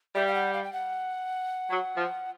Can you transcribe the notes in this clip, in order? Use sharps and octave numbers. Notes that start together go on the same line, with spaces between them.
G3 E5
F5
F#5
F5
G5
F#5
F#3
F3